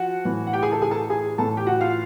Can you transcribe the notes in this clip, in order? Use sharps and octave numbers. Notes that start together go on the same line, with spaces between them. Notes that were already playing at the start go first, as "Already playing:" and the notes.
Already playing: F3 F#4 F#5
A2 E3
F#5
G4 G5
G#4 G#5
A4 A5
G#4 G#5
A4 A5
G#4 G#5
A2 E3 A4 A5
G4 G5
F#4 F#5
F4 F5